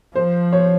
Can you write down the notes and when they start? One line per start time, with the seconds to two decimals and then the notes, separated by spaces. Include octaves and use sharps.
0.15 F3 C5
0.53 C#5